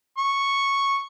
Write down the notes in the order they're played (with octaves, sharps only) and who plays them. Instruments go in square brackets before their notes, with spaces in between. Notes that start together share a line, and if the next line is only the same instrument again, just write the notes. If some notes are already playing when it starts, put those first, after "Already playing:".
[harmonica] C#6